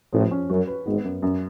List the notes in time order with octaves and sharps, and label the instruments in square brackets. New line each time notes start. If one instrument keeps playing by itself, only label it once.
[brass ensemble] A1 A2 [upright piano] F3
[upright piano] C#4
[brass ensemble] F#2 [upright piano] F#4
[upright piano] B4
[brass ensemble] G#1 G#2 [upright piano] B3
[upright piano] F#2
F#2